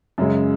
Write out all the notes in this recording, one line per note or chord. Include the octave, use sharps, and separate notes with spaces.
F#2 C#3 G#3